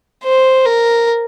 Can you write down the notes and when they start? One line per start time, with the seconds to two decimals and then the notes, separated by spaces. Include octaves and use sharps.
0.24 C5
0.65 A#4